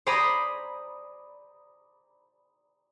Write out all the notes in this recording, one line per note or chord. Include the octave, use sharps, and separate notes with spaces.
C5 D5 G#5 A#5 B5 D#6